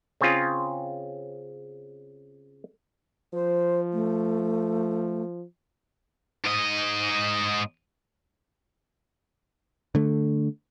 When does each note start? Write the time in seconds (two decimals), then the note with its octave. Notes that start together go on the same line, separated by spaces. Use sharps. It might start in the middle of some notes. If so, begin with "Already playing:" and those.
0.21 C#3 C4 C#4 F4 G#4
3.34 F3 C5
3.93 A3
6.45 G#2 D#5
9.95 D3 A3